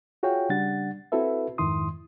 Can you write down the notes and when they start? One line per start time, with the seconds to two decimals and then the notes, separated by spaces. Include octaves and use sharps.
0.23 F4 F#4 G#4 C#5 F5 G5
0.49 C#3 G3 D4 F#5 A6
1.12 C4 E4 F#4 A4 B4 E5
1.58 F2 G#2 D#3 E4 C6 D#6